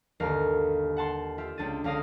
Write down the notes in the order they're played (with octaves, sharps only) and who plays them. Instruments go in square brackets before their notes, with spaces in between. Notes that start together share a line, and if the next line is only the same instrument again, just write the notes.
[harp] G1 D#2 D3 A#4 F5 A#5
F#5 A5 C6
F4 G4 E5
C#2 D4 G4 A6 D#7
C#2 D3 F5 D6 D#6 A#6